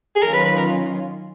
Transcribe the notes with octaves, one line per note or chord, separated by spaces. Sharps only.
G#4
D#3 F#3 C#4 F4 A#4
B4
B4
A#4